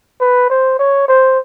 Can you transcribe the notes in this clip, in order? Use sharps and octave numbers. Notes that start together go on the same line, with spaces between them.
B4
C5
C#5
C5